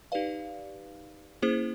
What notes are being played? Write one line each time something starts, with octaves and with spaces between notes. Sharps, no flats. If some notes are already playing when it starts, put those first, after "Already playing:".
D#4 G4 B4 D5 F5
A#3 C#4 E4 G#4 C5